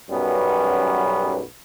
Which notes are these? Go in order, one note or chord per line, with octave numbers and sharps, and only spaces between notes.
B1 F#2 G3 B3 C#4 B4